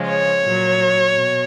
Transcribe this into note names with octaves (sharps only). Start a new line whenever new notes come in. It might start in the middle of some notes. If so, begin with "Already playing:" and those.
Already playing: C#3 F3 G#3
C#5
A#2 F#3
B2